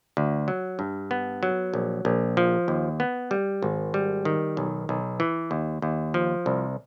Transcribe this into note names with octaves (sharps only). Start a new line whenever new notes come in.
D2
F#3
G2
B3
F#3
A#1
A#1
F3
D#2
B3
G3
G#1
G3
D#3
B1
B1
E3
D#2
D#2
F3
C2